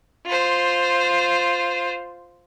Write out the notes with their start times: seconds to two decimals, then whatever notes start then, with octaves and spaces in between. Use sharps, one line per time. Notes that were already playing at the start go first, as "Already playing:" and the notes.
0.26 F4 C5